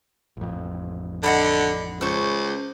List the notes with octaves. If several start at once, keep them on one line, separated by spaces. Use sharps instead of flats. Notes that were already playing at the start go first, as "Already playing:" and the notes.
A1 F2
D3 D#5 F#5 B5
C#2 C5 C#6